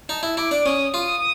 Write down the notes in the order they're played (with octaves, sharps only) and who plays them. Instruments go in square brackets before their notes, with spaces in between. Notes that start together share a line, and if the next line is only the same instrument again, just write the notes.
[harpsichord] D#4 [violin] A5
[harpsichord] E4
[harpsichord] E4 [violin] D6
[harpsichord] D4
[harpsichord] C#4 [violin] D#6
[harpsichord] F4 [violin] D#6